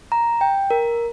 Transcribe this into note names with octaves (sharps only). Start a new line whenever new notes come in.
A#5
G5
A#4